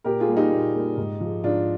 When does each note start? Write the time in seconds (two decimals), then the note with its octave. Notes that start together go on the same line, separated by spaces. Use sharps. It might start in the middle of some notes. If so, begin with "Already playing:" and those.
0.04 A#2 G4 A#4
0.20 F4 G#4
0.28 G3 A#3
0.36 D#4 G4
0.51 A#2
0.74 G3 A#3
0.97 G#2
1.21 F3 G#3
1.43 G#2 D4 F4